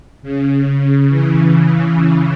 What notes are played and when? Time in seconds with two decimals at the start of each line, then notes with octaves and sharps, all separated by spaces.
0.23 C#3
0.51 C#3
1.08 E3